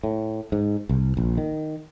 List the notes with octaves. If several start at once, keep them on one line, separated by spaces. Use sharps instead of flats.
A2
G#2
C2
A#1
D#3